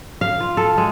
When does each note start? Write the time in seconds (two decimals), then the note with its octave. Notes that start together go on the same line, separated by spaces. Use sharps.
0.21 F5
0.40 F4
0.57 A4
0.78 G#3